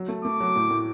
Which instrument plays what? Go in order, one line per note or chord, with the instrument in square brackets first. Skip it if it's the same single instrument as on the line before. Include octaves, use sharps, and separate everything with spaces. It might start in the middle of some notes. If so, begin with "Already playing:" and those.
Already playing: [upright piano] F#3
A3
[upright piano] A3 [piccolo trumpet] D6
[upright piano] F#3
A2
A2